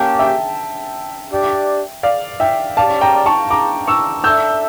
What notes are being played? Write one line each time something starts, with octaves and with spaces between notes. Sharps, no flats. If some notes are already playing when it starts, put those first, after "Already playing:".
Already playing: A#3 C#4 G4 A5
E5 G5
D4 G4 D5
D5 F5
E5 G5
C#4 G4 D5 F5 A5
G5 A#5
A5 C#6
A#5 D6
C#6 E6
D4 A4 E5 E6 G6